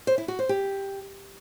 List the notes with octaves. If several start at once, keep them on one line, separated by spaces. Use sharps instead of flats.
C5
E4
F#4
C5
G4